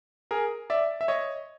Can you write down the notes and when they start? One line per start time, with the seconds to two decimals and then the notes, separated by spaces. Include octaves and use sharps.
0.31 G#4 A#4
0.70 D5 E5
1.01 E5
1.08 C#5 D#5